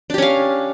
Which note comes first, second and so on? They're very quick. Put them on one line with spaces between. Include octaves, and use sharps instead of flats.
D4 G4 C#4 F5